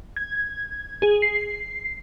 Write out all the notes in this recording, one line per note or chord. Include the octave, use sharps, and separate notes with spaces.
G#6
G#4
C7